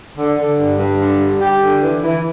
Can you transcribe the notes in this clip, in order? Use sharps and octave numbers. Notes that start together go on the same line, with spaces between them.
D3
D3
G2
G2
D3
G3
G4
D3
E3
E3